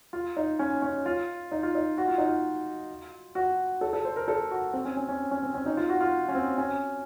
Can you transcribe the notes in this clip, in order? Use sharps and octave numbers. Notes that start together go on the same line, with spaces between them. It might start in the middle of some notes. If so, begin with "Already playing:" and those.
F4
D#4
C#4
C#4
F4
D#4
F4
D#4
F#4
F4
D#4
F4
F#4
A4
A4
C5
A#4
A4
F#4
C4
C#4
C#4
C#4
C#4
C4
C#4
D#4
F4
F#4
F4
C#4
C4
C#4